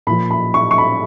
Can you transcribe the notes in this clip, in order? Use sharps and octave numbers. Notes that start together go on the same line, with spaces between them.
A#2 F3 B5
B5
C#6
C#6
B5